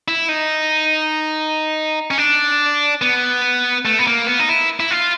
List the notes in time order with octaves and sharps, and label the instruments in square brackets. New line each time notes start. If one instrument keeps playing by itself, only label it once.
[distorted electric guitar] E4
D#4
C#4
D4
B3
A3
B3
A#3
B3
D#4
E4
E4
F4